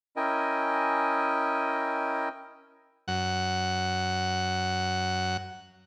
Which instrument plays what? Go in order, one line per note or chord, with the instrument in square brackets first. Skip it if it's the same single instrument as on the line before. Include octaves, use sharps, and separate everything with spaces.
[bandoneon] C#4 E4 A#4 D#5 G5 G#5
[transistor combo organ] F#2 F#5